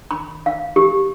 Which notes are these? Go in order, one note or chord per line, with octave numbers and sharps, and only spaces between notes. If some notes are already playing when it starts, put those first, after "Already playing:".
B5
F5
G4